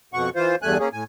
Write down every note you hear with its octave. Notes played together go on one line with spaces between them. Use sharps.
F2 B2 F#5 C#6
E3 F4 C5
E2 G2 A3 G#5 F#6
A#3 C#4 G#4
A2 G#5